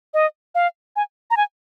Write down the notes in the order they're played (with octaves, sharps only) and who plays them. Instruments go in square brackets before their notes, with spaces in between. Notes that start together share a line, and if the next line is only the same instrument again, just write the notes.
[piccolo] D#5
F5
G#5
A#5
G#5